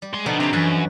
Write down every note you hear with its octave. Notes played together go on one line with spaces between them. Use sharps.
G3
G#3 C6
B2 D3 F3 B3 D4 D#4
C3 B4 C#5
F#2 E3 B4